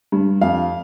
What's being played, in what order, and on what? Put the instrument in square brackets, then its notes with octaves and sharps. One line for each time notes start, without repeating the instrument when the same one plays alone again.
[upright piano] G2
F2 F5